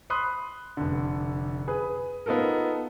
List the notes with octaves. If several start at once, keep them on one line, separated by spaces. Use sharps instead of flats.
B5 C6 D#6 F#6
F1 D3
G#4 B4
B3 D#4 F4 A4 A#4